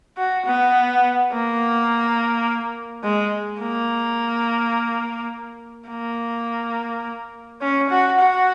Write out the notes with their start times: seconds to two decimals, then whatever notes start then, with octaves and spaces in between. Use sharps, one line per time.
0.17 F#4
0.46 B3
1.32 A#3
3.04 G#3
3.61 A#3
5.89 A#3
7.61 C#4
7.90 F#4
8.19 F#4